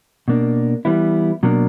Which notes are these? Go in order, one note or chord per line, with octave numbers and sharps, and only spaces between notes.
B2 A#3 D4
E3 G3 B3 E4
B2 F#3 A#3 D4